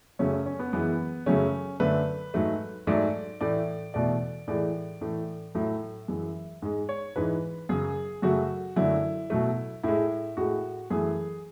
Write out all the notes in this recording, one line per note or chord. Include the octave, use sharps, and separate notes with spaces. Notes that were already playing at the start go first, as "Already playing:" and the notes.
F#2 C#3 F#3 A3 C#4
C#4
C#4
B3
F#2 E3 G#3 B3
F#2 C#3 F#3 A3 C#4
F#2 D3 A3 B4
G#2 F#3 A3
G#2 F#3 A3 D5
A2 E3 A3 D5
E2 B2 A3 D5
A2 E3 G#3 D5
A2 E3 A3
A2 F#3 A3 E5
F#2 E3 G#3
G#2 G#3
C#5
G#2 E3 G#3 B4
F#2 C#3 F#3 G#4
F#2 C#3 F#3 A3 F#4
F#2 D3 F#3 A3 E4
B2 F#3 A3
A2 G#3 E4
A2 G#3 F#4
F#2 E3 A3 G#4